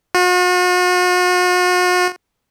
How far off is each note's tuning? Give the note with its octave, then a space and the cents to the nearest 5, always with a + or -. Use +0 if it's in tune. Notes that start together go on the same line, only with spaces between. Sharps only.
F#4 -45